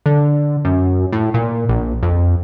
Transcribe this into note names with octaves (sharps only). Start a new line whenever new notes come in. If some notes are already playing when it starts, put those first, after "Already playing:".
D3
F#2
A2
A#2
A#1
F2